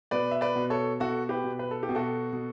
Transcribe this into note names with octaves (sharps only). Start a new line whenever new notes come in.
B2 B4 D5
E5
B4 D5
B2
A4 C#5
B2 F#4 A4
G4 B4
B2
B4
A4
G4
B2
F#4 A4
B2